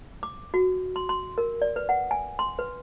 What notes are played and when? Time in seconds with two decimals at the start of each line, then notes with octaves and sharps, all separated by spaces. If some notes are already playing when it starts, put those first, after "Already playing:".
0.23 D6
0.54 F#4
0.96 C6
1.09 C6
1.38 A#4
1.62 D5
1.76 B4
1.89 F#5
2.11 G#5
2.39 C6
2.59 B4